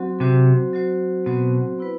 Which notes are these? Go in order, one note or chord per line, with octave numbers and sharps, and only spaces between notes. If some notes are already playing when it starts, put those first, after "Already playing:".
Already playing: F#3 C4 F#4 C5
C3 F#3 C4 F#4 C5
F#3 C4 F#4 C5
B2 F#3 C4 F#4 C5
B3 E4 B4